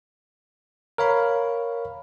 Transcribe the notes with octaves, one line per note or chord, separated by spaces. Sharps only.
A#4 C#5 F5 B5